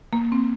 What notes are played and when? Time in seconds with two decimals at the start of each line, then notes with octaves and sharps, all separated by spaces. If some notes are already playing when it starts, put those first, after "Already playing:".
0.13 A#3
0.32 C4